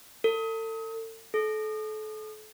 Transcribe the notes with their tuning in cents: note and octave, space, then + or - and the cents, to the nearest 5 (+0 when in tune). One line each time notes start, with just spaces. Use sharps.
A4 +35
A4 -30